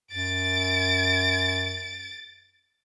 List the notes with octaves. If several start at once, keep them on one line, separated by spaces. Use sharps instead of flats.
F#2 A6 D7